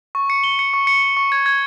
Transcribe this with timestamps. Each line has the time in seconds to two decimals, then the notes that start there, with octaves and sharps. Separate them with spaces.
0.15 C#6
0.30 C#7
0.44 G7
0.59 C#7
0.73 C#6
0.87 C#7
1.02 C#7
1.17 C#6
1.32 G#6
1.46 G#6